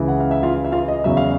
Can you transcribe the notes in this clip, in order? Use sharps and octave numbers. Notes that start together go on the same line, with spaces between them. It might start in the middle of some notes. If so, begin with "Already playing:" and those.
Already playing: C#2 C#3 E3
F#5
F5
E5
F4 F5
E5
F4 F5
D#5
E2 C#3 F#3 E5
F5